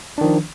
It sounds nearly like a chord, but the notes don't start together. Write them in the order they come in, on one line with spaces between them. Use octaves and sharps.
D4 D#3 F3